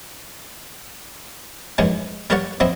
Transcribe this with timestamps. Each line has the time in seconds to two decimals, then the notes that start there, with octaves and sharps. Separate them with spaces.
1.78 F#2 D#3 E3 F#3 G#3
2.30 G3 A#4 C#5 D5 F#5
2.60 F#3 C4 E4 D#5